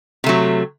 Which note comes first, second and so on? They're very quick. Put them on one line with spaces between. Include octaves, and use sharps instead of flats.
C3 A3 F#3